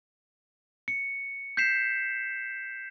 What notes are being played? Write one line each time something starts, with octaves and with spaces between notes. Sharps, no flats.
C#7
G6 B6 C7 E7